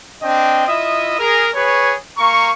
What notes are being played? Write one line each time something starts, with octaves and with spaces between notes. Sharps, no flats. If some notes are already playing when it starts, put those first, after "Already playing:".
C4 D4 D#5 G5
E4 F4 D#5 E5 D#6
G#4 A#4
G#4 B4 C#5
A#3 A#5 C#6